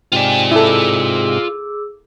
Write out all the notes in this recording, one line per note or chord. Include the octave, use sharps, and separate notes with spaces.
G#2 C3 F4 D5 G5 G#5
E4 G#4 A4 D6 E6